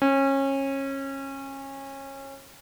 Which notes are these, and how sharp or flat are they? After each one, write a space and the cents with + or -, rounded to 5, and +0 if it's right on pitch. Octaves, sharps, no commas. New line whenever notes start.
C#4 -25